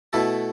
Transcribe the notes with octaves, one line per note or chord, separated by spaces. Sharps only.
B2 A3 E4 A4